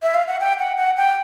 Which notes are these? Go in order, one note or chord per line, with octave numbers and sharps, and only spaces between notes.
E5
F5
F#5
G5
F#5
F#5
G5